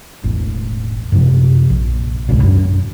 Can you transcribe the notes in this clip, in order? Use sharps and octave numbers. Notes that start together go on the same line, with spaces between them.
E1 A1
F#2 C3 F3
A#1
G#1 C#2 B2
F#2 D4